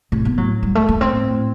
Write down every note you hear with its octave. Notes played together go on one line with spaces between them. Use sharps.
A2 C3 C4
B3
A2 F#3
G3
A3
A3
C4
A2
A2